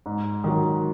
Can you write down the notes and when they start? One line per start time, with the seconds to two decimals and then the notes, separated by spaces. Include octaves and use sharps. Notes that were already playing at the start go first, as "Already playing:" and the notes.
0.06 G#2
0.44 D#3 F#3